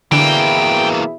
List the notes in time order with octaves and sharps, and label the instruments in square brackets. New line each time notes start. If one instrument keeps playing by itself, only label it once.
[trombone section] B2 E4 G#4 [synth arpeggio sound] D3 D4 [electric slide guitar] E3 A#3 [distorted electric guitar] G5